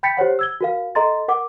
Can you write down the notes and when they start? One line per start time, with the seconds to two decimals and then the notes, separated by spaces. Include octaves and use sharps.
0.03 G5 B5 G6 A6 B6 C#7
0.17 G4 C5 C#5 F#5
0.39 E6 G#6 G7
0.61 F#4 A#4 F5
0.95 A4 D#5 A#5 C6 A6
1.28 A#4 F#5 D6